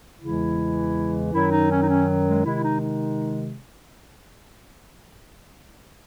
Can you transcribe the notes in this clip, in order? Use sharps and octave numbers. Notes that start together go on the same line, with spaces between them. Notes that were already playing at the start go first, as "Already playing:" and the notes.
E2 C#3 E3 G#3 E4
F#2 D#3 F#3 E4
D#4
C#4
D#4
C#4
G#3
C3 D#3 G#3 E4
D#4
D#4